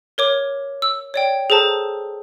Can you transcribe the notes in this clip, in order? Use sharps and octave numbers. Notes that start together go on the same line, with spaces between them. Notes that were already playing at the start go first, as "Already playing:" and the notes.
A#4 C#5 D6
E6
C#5 D5 G5
G#4 A4 C5 A5 A#5